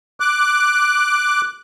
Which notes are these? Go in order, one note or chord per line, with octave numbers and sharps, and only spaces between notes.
D6 F#6